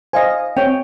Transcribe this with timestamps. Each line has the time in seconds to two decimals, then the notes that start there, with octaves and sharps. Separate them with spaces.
0.13 C5 D#5 F5 G#5
0.57 C4 C#5 G5